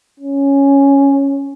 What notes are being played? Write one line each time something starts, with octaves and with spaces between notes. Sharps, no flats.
C#4